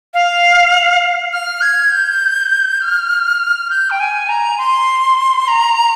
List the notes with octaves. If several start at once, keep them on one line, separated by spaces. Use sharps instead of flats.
F5
F6
G#6
G6
F6
G6
G5
G#5
A#5
C6
A#5